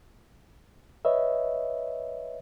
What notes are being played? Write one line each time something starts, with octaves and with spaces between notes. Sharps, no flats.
B4 C#5 D#5 E5